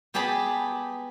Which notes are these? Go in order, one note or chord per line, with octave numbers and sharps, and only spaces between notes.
B3 G4 G#4 A5 B5